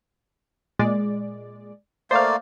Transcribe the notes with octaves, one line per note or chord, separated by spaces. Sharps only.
A#2 G#3 D5
A3 A#3 C5 D5 F5